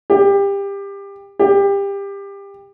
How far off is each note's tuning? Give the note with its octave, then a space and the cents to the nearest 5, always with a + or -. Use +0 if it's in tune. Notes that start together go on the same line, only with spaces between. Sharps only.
G4 +25
G4 +25